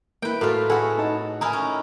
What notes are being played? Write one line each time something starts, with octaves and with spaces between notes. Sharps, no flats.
A#3 E4 B4 G5
A2 A3 F4 F#4 A#4
E4 F#4 G#4 A4 F#5
D#4 A5
D#4 E4 A#4 G#5 A#5
C#4